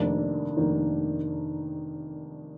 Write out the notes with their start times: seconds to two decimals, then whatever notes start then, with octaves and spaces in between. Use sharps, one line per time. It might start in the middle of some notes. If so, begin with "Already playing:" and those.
Already playing: F1 F2 D#3 A#3 D4
0.57 F1 F2 D#3 A#3 D4